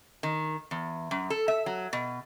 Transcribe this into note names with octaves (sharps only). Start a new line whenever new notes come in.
D#3
E2
F#2
A4
E5
F#3
B2